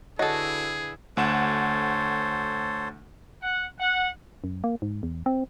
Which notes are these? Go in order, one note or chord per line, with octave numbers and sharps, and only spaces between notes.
D3 E4 F#4 G#4 A4 B4 C#5 D#5
D2 A4 C5 C#5 F#5 E7
F#5
F#5
F#2
A#3
G#2
E2
C4